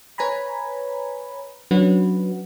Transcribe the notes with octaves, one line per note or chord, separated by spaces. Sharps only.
B4 C#5 G#5 A#5 B5
F#3 C#4 D4 F#4 B4